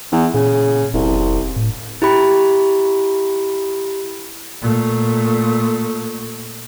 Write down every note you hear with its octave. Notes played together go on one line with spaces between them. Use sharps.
E2
A#2 C#3
F1 C2
A2
E4 G4 B5
A#2 A3